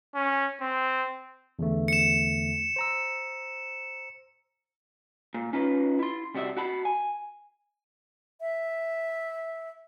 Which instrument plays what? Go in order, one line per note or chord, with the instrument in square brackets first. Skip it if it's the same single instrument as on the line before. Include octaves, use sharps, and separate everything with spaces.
[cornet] C#4
C4
[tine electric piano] E2 D3 A3
[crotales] C#7 E7
[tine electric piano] C5 A#5 E6
[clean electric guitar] A#2
C#4 D#4 F4 B4
E4 C6
C3 G3 F#4 D#5 E5
F#4 F#5 A5 B5
G#5
[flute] E5